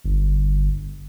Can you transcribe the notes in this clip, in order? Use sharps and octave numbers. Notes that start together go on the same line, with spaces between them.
G1